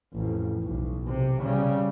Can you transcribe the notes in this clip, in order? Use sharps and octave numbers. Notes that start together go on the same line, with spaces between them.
A1 F2
B1
C3
C#3 G3